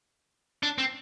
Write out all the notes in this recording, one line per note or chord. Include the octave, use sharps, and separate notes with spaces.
D4
C4